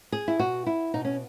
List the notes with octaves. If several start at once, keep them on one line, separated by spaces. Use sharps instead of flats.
G#4
E4
B2 F#4
E4
B2 D#4
C#4